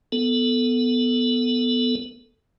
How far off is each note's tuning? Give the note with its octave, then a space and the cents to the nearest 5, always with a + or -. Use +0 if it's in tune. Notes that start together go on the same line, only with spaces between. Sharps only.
B3 +0 A4 +0